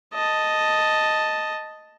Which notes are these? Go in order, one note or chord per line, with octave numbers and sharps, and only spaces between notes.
D#5 A5